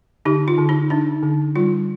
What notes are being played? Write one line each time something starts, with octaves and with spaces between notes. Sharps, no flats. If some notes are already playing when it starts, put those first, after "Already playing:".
D3 D#4 G4
F4
D3
D#4
D4 D#4
D3
G3 F4